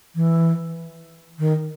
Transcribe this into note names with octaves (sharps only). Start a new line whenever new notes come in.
E3
D#3